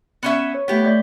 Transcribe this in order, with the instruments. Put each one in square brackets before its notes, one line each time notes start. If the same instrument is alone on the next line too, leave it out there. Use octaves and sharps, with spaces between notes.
[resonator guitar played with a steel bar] B3 C#4 E5
[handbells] C#5
[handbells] A3 B6 [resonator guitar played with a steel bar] B3 G4
[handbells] A3 D5 G6